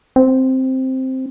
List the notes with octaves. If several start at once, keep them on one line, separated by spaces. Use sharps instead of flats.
C4